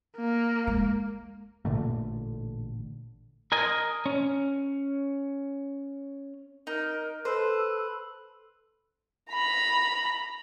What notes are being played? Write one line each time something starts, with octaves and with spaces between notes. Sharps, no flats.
A#3
G#3
A1 A#2 D3 A3
A#4 D#5 G#5
C#4
D#4 A#4
A4 B4 C5
A#5 B5